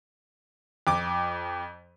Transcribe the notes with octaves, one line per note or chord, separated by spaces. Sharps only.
F2 D6